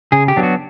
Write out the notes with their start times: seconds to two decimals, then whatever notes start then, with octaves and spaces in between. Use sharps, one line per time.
0.12 C#3 G#4
0.28 G4
0.36 F#3 B3 D4
0.43 F#4